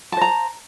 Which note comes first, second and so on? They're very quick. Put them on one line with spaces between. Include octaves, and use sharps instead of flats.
A5 C5 A#5